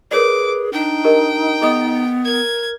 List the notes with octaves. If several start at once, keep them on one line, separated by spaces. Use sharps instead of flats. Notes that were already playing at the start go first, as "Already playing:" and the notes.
G#4 A#4 B4 C#5 D5 D6
D4 D#4 G5
G4 A#4 D#5
B3 G#4 D#5 D#6
A#4 G#6